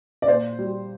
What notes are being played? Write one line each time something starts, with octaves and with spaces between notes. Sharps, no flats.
D5
A#2 C5
G3